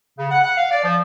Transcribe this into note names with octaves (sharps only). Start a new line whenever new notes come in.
C#3
F#5
F#5
F5
D5
F3